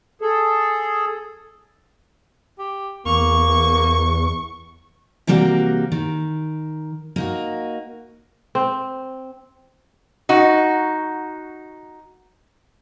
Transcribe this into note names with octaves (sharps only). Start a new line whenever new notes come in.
G#4 A4
G4
E2 A#3 C#6
C3 E3 G3 A#3 F#4
D#3
A#3 D#4 F#4
C4
D#4 F#4